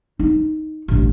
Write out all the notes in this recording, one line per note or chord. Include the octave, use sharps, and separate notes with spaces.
D#4
A1 G2